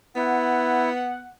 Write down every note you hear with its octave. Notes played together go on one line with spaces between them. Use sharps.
B3 E4 F#5